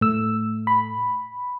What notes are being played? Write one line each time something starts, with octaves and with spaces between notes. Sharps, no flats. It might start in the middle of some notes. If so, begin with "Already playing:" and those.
A2 A3 E6
B5